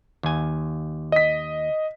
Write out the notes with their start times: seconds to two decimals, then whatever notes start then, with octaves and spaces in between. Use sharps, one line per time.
0.23 D#2 G#5
1.12 D#5 B6